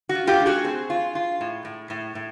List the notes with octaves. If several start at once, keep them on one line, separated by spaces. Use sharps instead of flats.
F#4
F4
F4 G4
A3
F#4 G#4
C4
F4
F4
A2
A2
A2
A2